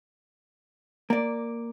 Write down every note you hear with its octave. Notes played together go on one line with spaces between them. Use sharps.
A#3 D5